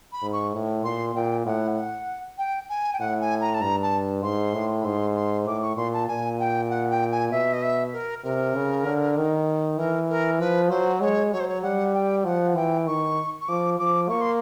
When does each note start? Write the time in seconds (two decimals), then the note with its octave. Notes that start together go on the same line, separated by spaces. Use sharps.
0.12 B5
0.22 G#2
0.33 C#6
0.54 A2
0.84 A#2 C6
1.15 A#2 G5
1.46 A2 F#5
1.76 F#5
2.38 G5
2.69 G#5
2.94 G5
3.00 A2 F#5
3.21 G#5
3.41 A#5
3.54 A5
3.61 G2 A#5
3.82 A5
4.23 G#2 C6
4.54 A2
4.80 B5
4.85 G#2 C6
5.16 C6
5.47 A2 D6
5.62 C#6
5.77 A#2 C6
5.93 A5
6.08 A#2 G#5
6.40 G5
6.70 F#5
6.90 G5
7.11 G#5
7.31 B2 E5
7.53 D#5
7.62 E5
7.93 A#4
8.24 C3 A#4
8.54 C#3
8.86 D3
9.17 D#3
9.78 E3 A#4
10.09 A#4
10.40 F3 B4
10.70 F#3 C5
11.01 G#3 C#5
11.32 F#3 C#5
11.40 C5
11.48 C#5
11.63 G3 F#5
11.94 G5
12.25 F3 F#5
12.56 E3 G5
12.87 D#3 C#6
13.41 C#6
13.49 F3 D6
13.79 F3 D6
14.09 A#3 C#6
14.21 C6